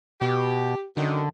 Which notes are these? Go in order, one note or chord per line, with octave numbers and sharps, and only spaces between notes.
B2 G4
F#2 D3 D#3